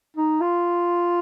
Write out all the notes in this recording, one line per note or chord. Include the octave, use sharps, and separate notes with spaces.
D#4
F4